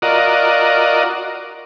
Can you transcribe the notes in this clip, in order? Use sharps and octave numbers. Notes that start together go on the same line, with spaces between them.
F4 F#4 A#4 D5 D#5